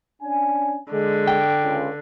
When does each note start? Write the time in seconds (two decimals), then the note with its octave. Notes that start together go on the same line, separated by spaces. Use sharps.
0.21 C#4 D4 G#5
0.91 D3 G#3
1.27 G5
1.62 C#2